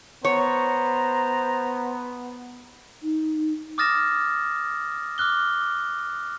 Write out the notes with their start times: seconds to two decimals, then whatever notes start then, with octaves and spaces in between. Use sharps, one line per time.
0.25 B3 C5 C#5 A#5
3.03 D#4
3.78 D6 D#6 F6 A6 A#6 E7
5.18 D6 F6 F#6 G7